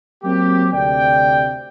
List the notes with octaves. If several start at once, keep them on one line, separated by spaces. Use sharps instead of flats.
F#3 A#3 C4 G4
D2 C3 D5 G5